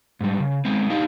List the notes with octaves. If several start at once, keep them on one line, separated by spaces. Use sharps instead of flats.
G#2 G3
C#3
G#3 B3 C4
D4 D#4 G4 F5